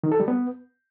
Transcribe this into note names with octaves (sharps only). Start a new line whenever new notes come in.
D#3
A4
G3
B3